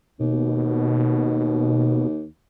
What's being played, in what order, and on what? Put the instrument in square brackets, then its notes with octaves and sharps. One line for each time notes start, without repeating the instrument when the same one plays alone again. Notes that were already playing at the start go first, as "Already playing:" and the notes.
[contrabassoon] D#2 [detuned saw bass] B2